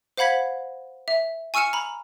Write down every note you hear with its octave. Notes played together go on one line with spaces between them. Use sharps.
C5 F5 F#5 B5 G#6 B6
E5
G#5 C#6 E6 F6 C#7 E7
A#5 B5